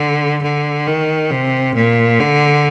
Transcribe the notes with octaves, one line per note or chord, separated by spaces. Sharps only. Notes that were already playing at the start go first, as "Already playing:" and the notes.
Already playing: D3
D3
D#3
C3
A#2
D3